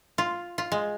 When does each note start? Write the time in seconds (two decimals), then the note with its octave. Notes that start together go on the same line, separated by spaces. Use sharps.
0.18 F4
0.58 F4
0.72 G#3